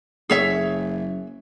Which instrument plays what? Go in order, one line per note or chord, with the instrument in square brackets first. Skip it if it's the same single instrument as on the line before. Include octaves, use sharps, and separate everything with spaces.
[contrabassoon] F#1 [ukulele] G#4 C#5 E5